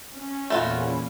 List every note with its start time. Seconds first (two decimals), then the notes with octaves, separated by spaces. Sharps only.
0.14 C#4
0.50 E2 A#2 A3 F4 F#4 B5